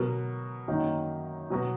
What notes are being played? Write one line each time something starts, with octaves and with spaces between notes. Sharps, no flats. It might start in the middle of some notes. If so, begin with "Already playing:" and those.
Already playing: B2 F#3 B3 F#4 A#4
F#2 D#3 F#3 A#3 D#4
B2 F#3 B3 F#4